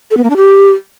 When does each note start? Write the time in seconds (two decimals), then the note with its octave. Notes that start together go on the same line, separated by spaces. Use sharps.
0.11 A4
0.17 B3
0.24 A#3
0.30 D4
0.37 G4